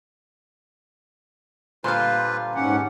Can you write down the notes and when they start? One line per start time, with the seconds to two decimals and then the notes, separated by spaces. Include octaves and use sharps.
1.84 A#2 D3 G3 F4 B4 C5 F5
2.55 G#2 E3 C#4 G4 F#5